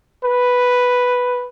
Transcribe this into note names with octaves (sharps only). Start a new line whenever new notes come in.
B4